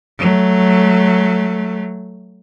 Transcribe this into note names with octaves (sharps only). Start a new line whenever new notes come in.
F#3 A3